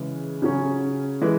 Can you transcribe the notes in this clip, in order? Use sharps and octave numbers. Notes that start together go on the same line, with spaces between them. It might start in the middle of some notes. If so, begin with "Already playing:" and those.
Already playing: C#3 E3 G#3
C#3 F#3 C#4
E3 G#3